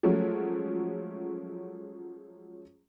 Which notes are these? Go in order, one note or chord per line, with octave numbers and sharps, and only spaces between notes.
F3 F#3 G#3 A3 C#4